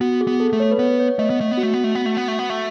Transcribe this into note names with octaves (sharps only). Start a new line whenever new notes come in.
B3 F#4
G#4
B3
A4
A3
C#5
B4
B3 C#5
C#5
A3 D#5
B3
A3
B3
F#4
A3
B3
A3
B3
A3
B3
A3
B3
A3